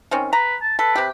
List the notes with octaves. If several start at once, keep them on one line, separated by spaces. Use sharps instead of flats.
D#3 C4 C#4
B4 A#5
A5
A4 B4
C3 G4